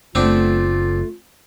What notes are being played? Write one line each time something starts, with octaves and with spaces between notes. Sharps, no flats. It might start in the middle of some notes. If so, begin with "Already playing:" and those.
F#1 A3 B3 C4 D4 F4